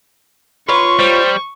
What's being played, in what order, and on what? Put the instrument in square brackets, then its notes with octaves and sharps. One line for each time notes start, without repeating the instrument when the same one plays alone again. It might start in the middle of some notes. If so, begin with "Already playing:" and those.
[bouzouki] F4 B4 C#5 [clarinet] C6 [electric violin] C#6
[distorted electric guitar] G3 [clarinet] C5